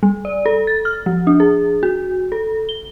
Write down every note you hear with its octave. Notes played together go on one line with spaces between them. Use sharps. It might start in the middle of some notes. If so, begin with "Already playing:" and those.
G3
D5
A4
A6
F6
F3
D4
G#4
F#4
A4
G7